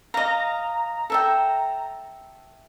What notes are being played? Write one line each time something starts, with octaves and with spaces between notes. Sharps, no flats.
D#5 F5 A#5
A4 E5 G5